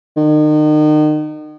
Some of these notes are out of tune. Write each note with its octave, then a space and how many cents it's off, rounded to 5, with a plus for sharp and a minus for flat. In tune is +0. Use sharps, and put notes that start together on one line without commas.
D#3 -35